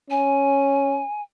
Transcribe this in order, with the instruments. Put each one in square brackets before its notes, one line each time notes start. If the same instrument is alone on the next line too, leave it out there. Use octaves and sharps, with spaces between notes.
[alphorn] C#4 [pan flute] G#5